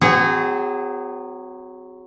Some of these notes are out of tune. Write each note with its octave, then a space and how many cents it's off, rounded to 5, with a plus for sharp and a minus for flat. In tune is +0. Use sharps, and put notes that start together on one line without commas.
F#3 +0 C4 -40 G#4 -20